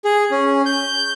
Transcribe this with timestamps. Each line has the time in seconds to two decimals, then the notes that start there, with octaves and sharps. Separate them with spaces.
0.05 G#4
0.31 C#4
0.66 G6